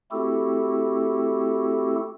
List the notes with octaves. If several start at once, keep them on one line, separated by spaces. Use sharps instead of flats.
A3 C4 E4 F#4 G4 A4